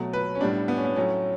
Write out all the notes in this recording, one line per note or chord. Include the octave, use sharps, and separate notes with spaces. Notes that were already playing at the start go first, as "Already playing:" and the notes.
Already playing: B2 F#3 A3
B4
C#4
A2 G3 B3 D4
B3
C#4
B3
A2 F#3 A3 C#4